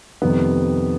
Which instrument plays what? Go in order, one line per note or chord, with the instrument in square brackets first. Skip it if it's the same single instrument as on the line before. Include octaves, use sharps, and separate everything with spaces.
[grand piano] F2 C3 D#3 G3 B3